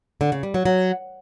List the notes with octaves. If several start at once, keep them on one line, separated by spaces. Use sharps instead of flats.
D3
C#3
G3
F#3
F#3